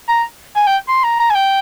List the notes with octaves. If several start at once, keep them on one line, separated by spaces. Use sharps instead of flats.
A#5
G#5
G5
C6
A#5
A#5
G#5
G5